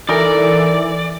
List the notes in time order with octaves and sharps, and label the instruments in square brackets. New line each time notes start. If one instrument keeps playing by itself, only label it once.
[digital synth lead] E3 [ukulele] D#4 A#4 [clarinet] A4 [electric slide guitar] D5